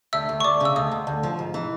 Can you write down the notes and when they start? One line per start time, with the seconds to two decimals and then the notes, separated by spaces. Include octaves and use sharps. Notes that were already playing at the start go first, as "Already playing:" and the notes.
0.13 D2 E5 E6
0.29 D2
0.40 C#6
0.44 D2 D5 D6
0.60 C#3 E6
0.76 D2 D#5 D#6
0.92 D2
1.07 D2
1.23 F3
1.39 G#2
1.54 E3